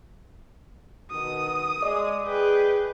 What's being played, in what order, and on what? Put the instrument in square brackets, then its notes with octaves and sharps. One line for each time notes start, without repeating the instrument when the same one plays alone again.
[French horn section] B2 D#3 [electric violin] D#6
[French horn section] G#3 [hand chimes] D5 D#5 D6
[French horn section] G#4 [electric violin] B4 G5